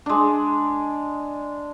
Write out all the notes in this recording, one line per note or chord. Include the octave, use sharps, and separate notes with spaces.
G#3 D4